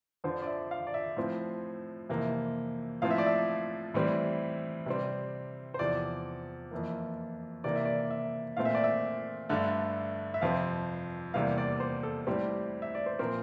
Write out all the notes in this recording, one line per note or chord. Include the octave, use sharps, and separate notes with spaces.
F2 D3 F3 C5
D5
E5
F5
D5
E5
A2 F3 C4
F2 C3 E3 A#3
A2 F3 C4 F5
E5
D5
E5
A2 E3 G3 C4
C3 G3 C4
C5
E2 C3 F3 D5
F2 E3 A#3
C3 E3 A#3 D5
E5
D5
E5
A#2 A3 C4 F5
E5
D5
E5
G2 D3 A3
E5
F2 C3 F3 C4 F5
E2 C3 G3 A#3 F5
D5
C5
A4
A2 G3 C4 G4
E5
D5
C5
A#2 F3 C4 A#4